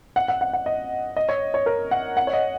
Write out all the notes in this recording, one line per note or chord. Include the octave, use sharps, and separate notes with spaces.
F#5
F#5
F#5
F#5
D#5
D#5
C#5
C#5
A#4
F#5
F#5
C#5
D#5